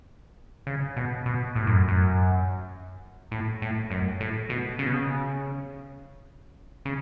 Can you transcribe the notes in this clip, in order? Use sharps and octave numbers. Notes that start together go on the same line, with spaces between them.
C#3
B2
B2
A2
F#2
F#2
A2
A2
F#2
A2
B2
C#3
B2
C#3
C#3